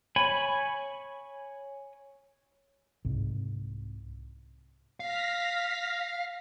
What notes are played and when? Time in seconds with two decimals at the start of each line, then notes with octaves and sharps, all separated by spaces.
0.16 C#5 G#5 B5
3.05 C2 G#2
5.00 F5 F6 A#6 B6